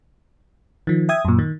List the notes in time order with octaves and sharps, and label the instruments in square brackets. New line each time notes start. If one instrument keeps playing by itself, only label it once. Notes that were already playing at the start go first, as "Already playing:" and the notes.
[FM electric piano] D#3 F3
E5 G5 D#6 G#6
F#2 A#2
D#3